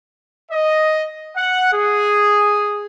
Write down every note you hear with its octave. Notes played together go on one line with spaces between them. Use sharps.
D#5
F#5
G#4